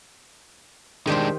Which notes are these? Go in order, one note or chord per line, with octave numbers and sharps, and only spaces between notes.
D#3 G#3 D4 G4 C5